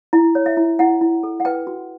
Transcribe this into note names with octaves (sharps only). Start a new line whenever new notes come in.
E4
C#5
E5
E4
E4 F#5
E4
A4
F#5
B4 G5
F#4